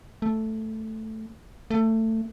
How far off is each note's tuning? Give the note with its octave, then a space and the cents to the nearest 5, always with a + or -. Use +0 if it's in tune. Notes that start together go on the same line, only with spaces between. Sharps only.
A3 +0
A3 +20